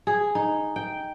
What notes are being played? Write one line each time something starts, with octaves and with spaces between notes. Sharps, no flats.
G#4
D#4
G5